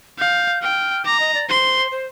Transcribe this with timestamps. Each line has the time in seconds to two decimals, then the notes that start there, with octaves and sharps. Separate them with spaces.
0.19 F5 G6
0.62 G5 F6
1.05 A#5 D6
1.20 D#5
1.34 D5
1.48 C5 C6
1.91 C5